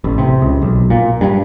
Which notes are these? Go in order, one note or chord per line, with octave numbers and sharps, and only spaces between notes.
A1
C3
C#2
B1
A#2
G2